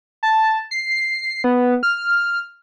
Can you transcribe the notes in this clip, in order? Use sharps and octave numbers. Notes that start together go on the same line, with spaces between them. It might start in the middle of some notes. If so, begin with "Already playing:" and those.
A5
C7
B3
F6